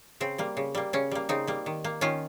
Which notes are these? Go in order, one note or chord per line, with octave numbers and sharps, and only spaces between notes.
C#3 C4
G3 A#3
C#3
G3 A#3
C#3 C#4
G3 A#3
C#3 C4 D#4
G3 A#3
D#3
A#3
D#3 C#4 F4